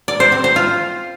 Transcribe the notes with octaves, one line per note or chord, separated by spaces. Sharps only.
D5
C5
C4
C5
F4